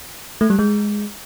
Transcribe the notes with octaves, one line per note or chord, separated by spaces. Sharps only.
A3
G3
G#3